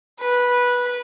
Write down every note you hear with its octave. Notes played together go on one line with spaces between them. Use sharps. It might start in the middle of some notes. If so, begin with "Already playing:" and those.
B4